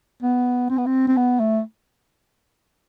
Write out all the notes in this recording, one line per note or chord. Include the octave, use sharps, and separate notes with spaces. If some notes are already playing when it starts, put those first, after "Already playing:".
B3
C4
B3
C4
C4
B3
A3